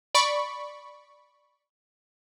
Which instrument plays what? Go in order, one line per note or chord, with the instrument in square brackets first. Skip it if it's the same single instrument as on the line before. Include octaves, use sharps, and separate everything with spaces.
[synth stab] D5 B5 C#6